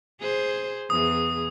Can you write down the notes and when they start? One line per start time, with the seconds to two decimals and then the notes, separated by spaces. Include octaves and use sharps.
0.21 G#4 C5
0.90 E2 G#4 D#6